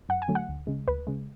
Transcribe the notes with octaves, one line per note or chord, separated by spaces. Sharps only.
F#2 F#5
G#5
D3 F#3 A3
F#5
D2
C#3 G#3
D2 B4
C#3 G#3